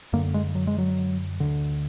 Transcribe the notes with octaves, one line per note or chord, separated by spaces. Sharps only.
F#2 D3 A#3
G#3
F#3
G#3
F#3
D2 D3